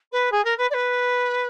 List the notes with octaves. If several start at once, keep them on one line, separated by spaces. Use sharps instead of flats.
B4
G#4
A#4
B4
D5
B4